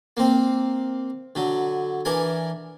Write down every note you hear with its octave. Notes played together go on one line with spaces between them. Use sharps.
A#3 C4
D3 F#3
E3 D4 A#4 G#5